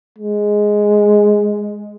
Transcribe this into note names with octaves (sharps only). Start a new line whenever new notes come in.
G#3